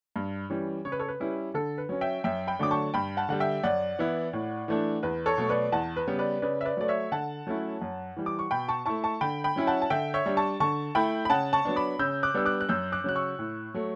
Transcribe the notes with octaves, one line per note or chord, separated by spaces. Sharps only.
G2
E3 G3 C#4
C#3 C#5
B4
A4 C#5
B4
G3 C#4 E4
D3 A4
B4
F#3 C#4
E5 G5
F#2 E5 G5
G5 B5
D3 F#3 A3 D4 D6
A5 C#6
G2 G5 B5
F#5 A5
D3 G3 F#5
E5 G5
F#2 D5 F#5
E3 B3 E4
A2
E3 A3 D4
E2 B4
A4 C#5
B2 F#3 A3
B4 D5
E2 F#5 A5
B4
C#3 G3 B3
B4 D5
C#3 B4 D5
E5
B4 D5
F#3 A3 D5
C#5 E5
D3 F#5 A5
F#3 A3 C#4 E4
F#2
E3 G3
D6
C#6
B2 G5 B5
A5 C#6
A3 E4 A5 C#6
A5 C#6
D3 G5 B5
G5 B5
F#3 C#4 E4
F#5 A5
A5
D3 E5 G5
C#5 E5
G3 D4
A5 C#6
D3 A5 C#6
A3 E4 G5 B5
B5
C#3 F#5 A5
A5 C#6
F#3 B3 D4
B5 D6
C#3 E6 G6
D6 F#6
G3 B3 D4 E6
D6 F#6
F#6
F#2 E6 G6
D6 F#6
C#3 F#3 F#6
C#6 E6
A2
F#3 A3